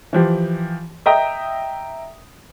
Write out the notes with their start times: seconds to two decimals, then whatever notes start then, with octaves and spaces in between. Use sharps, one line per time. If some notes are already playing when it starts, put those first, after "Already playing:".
0.13 E3 F3 G4
1.06 D#5 E5 G5 A#5 D#6